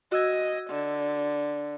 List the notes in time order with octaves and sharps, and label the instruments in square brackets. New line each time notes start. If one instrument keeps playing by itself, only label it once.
[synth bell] F#4 E6 G#6 [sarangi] D#5
[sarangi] D3